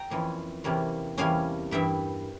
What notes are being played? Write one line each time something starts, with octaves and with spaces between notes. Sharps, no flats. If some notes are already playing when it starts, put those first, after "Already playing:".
Already playing: G5 A#5
F2 E3 A#3 C#4
E2 C3 G3 A#3 C#4
E2 C3 G3 A#3 C#4 F5 G#5
G2 E3 A#3 E5 G5